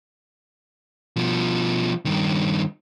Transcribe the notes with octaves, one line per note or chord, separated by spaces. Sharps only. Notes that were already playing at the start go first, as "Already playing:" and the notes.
B2 F3
G2 D#3